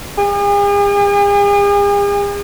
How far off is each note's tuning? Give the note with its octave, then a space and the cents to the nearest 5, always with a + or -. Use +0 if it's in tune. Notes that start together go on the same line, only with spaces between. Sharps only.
G#4 -45